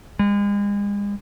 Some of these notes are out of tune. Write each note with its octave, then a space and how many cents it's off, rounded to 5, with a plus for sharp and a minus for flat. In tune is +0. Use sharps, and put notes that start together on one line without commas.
G#3 -40